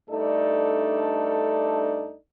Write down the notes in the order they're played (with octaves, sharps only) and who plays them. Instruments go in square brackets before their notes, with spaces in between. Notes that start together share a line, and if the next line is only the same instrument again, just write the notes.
[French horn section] G2 A3 D4 D#4 A4 D5